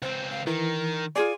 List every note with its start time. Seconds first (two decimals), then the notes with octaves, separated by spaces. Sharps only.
0.02 C#2 C4 C5
0.30 F5
0.47 D#3 E3 A#4
1.16 F4 G#4 D5 G#5